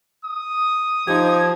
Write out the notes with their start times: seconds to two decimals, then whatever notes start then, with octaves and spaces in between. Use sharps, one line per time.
0.24 D#6
1.07 F3 D#4 G4 G#6